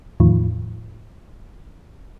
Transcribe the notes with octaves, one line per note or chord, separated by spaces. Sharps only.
E2 A2 D#3 F3